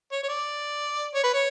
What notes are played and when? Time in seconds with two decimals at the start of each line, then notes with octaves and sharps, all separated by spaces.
0.12 C#5
0.23 C#5
0.29 D5
1.15 C#5
1.24 B4
1.34 C#5